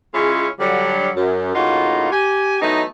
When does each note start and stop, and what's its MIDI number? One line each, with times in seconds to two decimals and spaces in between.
0.14 0.47 49
0.14 0.47 56
0.14 0.47 61
0.14 0.47 64
0.14 0.47 65
0.14 0.47 68
0.59 1.08 50
0.59 1.08 54
0.59 1.08 55
1.16 1.55 42
1.55 2.08 45
1.55 2.08 49
1.55 2.08 58
1.55 2.08 63
1.55 2.08 65
1.55 2.08 66
2.11 2.61 67
2.11 2.61 80
2.61 2.83 52
2.61 2.83 54
2.61 2.83 57
2.61 2.83 59
2.61 2.83 63